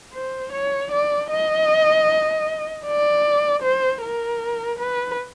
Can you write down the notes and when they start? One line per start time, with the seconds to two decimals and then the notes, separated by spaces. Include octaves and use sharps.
0.14 C5
0.53 C#5
0.91 D5
1.30 D#5
2.85 D5
3.63 C5
4.02 A#4
4.79 B4